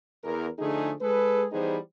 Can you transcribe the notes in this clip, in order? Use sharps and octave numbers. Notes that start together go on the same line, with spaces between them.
E2 A#4
D3 F3 A3 D#4 G#4
G#3 G#4 A4 B4
E3 G3 B3 D#4 G#4 C5